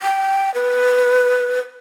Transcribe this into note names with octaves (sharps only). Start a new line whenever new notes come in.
G5
B4